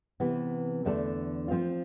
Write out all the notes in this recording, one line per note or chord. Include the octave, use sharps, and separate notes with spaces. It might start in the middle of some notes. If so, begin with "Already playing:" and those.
C3 E3 B3
E2 D3 A3 D4 A4
F3 C4 F4